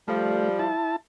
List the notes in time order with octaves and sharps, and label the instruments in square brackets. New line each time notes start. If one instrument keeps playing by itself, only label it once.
[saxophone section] F3 G3 [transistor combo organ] A3
[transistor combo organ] E4 A5